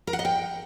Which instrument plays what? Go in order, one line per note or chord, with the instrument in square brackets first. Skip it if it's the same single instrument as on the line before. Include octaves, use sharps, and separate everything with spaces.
[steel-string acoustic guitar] A#4
F#5
D#5
G5